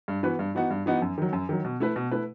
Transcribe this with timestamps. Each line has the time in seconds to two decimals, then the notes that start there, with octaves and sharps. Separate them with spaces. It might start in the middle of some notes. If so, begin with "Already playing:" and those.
0.08 G2
0.23 E3 B3 F#4 B4
0.39 G2
0.55 E3 B3 D#4 F#4
0.70 G2
0.86 E3 B3 D#4 F#4
1.02 F#2
1.18 D#3 F#3
1.33 F#2
1.49 D#3 F#3
1.65 B2
1.80 A3 E4 B4
1.96 B2
2.11 A3 E4 B4